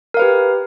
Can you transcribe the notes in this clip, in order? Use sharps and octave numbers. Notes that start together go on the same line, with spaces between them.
G4 A#4 B4 F5